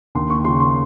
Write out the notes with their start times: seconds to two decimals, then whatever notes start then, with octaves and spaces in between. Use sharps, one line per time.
0.15 D#2 C6
0.30 C#6
0.45 C#3 C6
0.60 C6